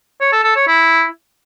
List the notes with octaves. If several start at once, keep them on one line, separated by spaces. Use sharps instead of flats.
C#5
A4
A4
C#5
E4